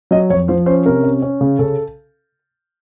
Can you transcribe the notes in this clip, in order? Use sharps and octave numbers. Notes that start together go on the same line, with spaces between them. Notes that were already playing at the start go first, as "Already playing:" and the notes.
F#3 D#5
F2 C#5
F3 C5
C#4 C5
C3 A#4
C#4
C#4
C#3
C#3 A4